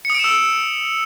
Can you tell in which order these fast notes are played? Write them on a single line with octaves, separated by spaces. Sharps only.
C#7 D#6 D7 E7 E6